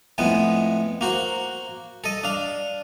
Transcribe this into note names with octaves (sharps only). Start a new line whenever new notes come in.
F2 A2 G#3 B3
A#3 F#4 C5
A4 D#5
D4 F5